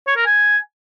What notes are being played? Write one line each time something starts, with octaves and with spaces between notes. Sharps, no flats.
C#5
A#4
G#5